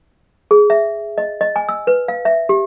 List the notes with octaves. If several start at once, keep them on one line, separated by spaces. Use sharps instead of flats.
G#4
E5
D#5
D#5
G#5
E6
B4
F5
E5
G4